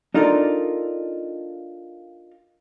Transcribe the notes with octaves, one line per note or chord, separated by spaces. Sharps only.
D4 D#4 F4 A4 A#4 D5